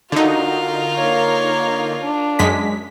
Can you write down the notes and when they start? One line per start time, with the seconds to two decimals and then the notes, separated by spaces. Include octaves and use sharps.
0.12 D3 D#4 F4 F#4 A#4
0.96 A#3 C#5
2.04 D4
2.39 F#2 G#3 B6